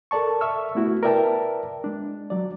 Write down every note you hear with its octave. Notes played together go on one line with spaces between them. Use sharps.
A4 A#4 D5 A5 C#6
E5 C#6 E6 F6
A3 B3 E4 F#4
A#4 B4 D5 E5 G5 A5
G#3 D4
F#3 D5